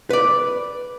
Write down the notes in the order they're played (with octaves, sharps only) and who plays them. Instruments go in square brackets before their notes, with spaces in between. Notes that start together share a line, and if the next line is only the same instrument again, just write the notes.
[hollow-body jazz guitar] B4 D5